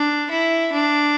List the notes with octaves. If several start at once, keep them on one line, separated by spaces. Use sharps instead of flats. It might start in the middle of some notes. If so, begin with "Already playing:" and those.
Already playing: D4
E4
D4